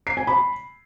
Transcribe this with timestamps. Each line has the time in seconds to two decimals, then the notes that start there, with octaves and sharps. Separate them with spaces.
0.07 C7
0.17 G#5
0.27 B5